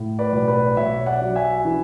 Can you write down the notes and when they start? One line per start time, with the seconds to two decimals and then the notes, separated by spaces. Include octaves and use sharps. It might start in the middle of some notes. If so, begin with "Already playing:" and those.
Already playing: A2
0.19 B4 D5
0.33 B1
0.48 B4 D5
0.77 B1 C#5 E5
1.06 D5 F#5
1.22 F#3
1.36 E5 G#5
1.65 E3